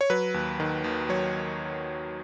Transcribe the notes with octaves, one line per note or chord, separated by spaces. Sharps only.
C#5
F#3 B4
D#2
D#3
D#2
F#3 C#5